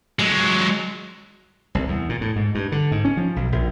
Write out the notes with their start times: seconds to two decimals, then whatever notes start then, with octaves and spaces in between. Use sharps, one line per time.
0.19 F#3 G#3
1.75 C2
1.88 E2
2.09 A#2
2.21 A2
2.36 G#2
2.55 G2
2.72 D3
2.92 G#2
3.05 C#4
3.17 F3
3.36 B1
3.52 A#1